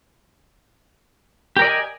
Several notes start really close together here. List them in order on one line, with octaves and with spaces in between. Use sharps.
G4 A#4 D5 D#5 G#5